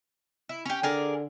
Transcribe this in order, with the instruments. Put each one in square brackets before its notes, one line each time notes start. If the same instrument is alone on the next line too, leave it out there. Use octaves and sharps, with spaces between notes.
[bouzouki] E4
C#4 G4
[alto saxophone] D3 [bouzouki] G#4 A#4 D5